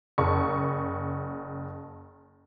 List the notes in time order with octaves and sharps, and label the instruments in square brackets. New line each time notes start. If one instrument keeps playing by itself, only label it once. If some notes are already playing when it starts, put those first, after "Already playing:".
[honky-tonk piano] F#1 C#6